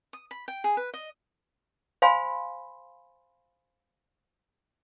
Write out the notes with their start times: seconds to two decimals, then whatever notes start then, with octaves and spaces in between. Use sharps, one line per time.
0.13 D#6
0.31 B5
0.48 G5
0.64 G#4
0.77 B4
0.94 D#5
2.02 C5 F5 G#5 B5 C6